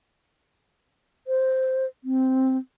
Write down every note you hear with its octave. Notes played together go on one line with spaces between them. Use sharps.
C5
C4